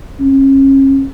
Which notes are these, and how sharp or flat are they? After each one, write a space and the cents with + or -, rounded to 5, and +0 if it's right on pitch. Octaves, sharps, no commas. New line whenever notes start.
C#4 -35